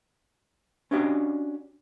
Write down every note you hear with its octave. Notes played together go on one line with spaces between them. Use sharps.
C#4 D4 F#4 G4 D#5 F5